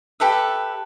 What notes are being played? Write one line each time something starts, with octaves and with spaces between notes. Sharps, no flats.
G4 A4 B4 E5